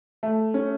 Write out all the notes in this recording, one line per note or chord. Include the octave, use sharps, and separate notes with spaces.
A3
C#4